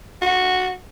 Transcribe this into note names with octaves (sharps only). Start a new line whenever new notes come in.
F#4